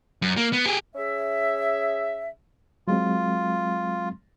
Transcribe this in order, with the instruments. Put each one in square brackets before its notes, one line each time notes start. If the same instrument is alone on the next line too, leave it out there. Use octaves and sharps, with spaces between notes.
[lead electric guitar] F#2
A#3
B3
G4 G#4
[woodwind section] C#4 G#4 E5
[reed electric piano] F#3 G#3 C4 [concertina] F4